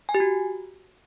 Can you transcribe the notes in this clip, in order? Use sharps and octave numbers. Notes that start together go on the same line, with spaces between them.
G#5
G4
F#4